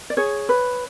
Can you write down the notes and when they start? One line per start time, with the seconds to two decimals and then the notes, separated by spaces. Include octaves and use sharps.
0.10 D5
0.17 G#4 C#5
0.49 B4